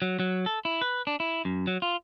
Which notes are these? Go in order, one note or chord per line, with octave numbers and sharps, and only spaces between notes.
F#3
F#3
A4
E4
B4
D4
E4
F#2
F#3
F4